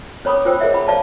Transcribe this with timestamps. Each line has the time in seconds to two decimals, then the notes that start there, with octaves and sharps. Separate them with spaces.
0.25 C#4 C#5 B5 D6 D#6
0.45 F4 C5 G5 E6
0.60 G#4 A#4 C#5 D#5 E5 F#5
0.74 B5
0.88 C#5 D5 F5 A5